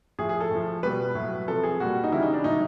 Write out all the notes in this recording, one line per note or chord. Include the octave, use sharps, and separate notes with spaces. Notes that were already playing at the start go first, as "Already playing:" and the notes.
A2 F3 G#4
G#4
A4
A2 F3
B2 G3 B4
A2 F#3
C3 F3 A4
G#4
A#2 G3 F#4
D#4
C#3 E3 G3 E4
D#4
D4
A2 F#3 D#4